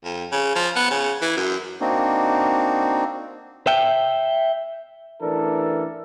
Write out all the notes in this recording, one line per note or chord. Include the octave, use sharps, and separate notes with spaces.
F2
C#3
F3
B3
C#3
E3
F#2
A#3 C4 D4 D#4 F#4
E5 G5
A1 E3 D4 A4 A#4